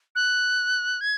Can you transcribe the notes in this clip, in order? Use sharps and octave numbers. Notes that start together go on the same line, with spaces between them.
F#6
G#6